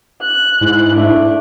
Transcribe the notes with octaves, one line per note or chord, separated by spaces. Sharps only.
F#6
G#2 E4
A3 D4